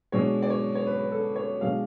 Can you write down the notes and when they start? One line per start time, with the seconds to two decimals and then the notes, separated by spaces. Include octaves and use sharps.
0.12 B2 G#3 D4 C#5
0.42 D5
0.50 C#5
0.75 C#5
0.87 B4
0.99 B4
1.12 A4
1.36 C#5
1.61 B2 G#3 D4 F5